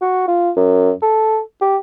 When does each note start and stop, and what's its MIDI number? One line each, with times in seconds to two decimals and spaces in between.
0.01 0.25 66
0.28 0.50 65
0.57 0.91 42
1.02 1.40 69
1.61 1.77 67